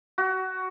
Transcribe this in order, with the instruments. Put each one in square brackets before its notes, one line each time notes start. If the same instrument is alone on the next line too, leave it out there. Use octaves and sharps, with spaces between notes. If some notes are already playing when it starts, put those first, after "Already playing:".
[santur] F#4